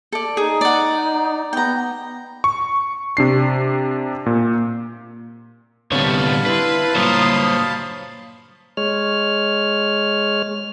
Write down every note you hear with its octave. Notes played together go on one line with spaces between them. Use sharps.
A4 D5
D#4 G#4
D5 F#5
B3 G5 A#5
C#6
C3 D4 C7
A#2
D3 G3 B3 C4 C#5 F5 A5 B5
E4 B4 C6
G2 A#2 F#3 C5 C#5 A#5 C6 D#6
G#3 C#5 F6